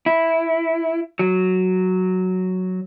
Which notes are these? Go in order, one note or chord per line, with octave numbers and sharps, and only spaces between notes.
E4
F#3